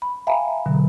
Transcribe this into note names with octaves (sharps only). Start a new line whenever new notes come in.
B5
E5 F5 G5 G#5 A#5 B5
B2 D3 F#3